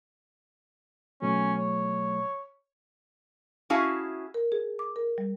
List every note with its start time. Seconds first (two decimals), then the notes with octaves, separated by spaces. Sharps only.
1.22 B2 F#3 A3 C#4
1.58 C#5
3.70 C#4 E4 F#4 G#4 F5 A5
4.34 A#4
4.52 G#4
4.79 D6
4.96 A#4
5.18 G3